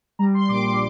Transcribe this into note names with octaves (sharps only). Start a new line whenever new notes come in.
G3 A#5
C6
A#1 D6
C6